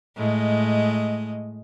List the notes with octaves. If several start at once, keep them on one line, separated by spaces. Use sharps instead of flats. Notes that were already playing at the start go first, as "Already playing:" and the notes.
A2 G#3 D#5